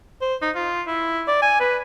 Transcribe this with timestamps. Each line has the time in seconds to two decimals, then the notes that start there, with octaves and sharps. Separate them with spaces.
0.22 C5
0.42 D#4
0.56 F4
0.87 E4
1.28 D5
1.42 G#5
1.60 B4